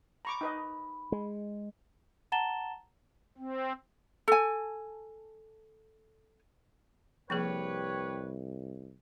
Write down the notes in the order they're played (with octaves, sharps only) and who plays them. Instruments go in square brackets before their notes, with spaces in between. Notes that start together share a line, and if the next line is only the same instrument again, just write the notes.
[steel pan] A#5 C#6 D6 [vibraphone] B5
[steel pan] D#4 B4 D#5
[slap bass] G#3
[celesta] F#5 A5 A#5 A6 E7 G7
[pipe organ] C4
[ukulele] A4 G#5
[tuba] C2 [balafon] F3 A#3 G#4 [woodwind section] G4 B4 C#5